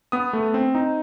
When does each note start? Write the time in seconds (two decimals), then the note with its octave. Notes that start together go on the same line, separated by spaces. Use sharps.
0.12 B3 D#6
0.33 A3
0.54 C4
0.75 D#4